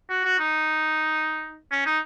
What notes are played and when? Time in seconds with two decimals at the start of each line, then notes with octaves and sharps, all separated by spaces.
0.10 F#4
0.25 F#4
0.39 D#4
1.71 C#4
1.86 D#4